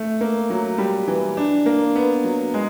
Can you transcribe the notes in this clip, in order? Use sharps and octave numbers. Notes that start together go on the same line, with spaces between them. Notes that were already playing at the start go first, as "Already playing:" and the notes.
Already playing: A3
A#3
F#3
G3
E3
D4
A#3
B3
F#3
G#3